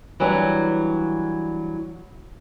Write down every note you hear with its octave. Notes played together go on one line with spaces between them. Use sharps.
E3 F#3 G3 D4